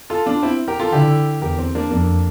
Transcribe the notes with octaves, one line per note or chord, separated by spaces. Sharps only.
F4 A4
D4 F4
C4 E4
G4 A#4
F4 A4
D3 E4 G4
E2 G4 A#4
C4
A#3 D4
F2 A#3 D4